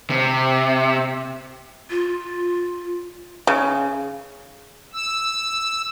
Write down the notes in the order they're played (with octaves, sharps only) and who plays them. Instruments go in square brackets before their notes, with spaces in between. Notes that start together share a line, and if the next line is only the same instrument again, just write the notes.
[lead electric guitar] C3
[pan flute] F4
[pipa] C#3
[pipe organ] E6